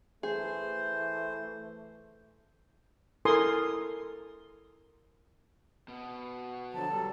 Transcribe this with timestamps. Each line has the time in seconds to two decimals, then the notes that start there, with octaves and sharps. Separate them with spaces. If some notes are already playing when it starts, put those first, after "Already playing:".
0.23 E3 A3 G#4 C5
3.25 E4 A4 A#4 G#5 C6 D#6
5.88 B2 B3
6.73 D3 F3 F#3 A5
6.88 F#3 G3 A4